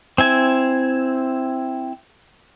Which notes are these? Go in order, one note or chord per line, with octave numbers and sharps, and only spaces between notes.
C4 E4 G#5